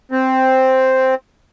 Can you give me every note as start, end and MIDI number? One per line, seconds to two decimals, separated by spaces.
0.12 1.15 60